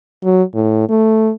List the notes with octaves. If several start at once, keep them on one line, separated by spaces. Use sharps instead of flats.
F#3
A2
A3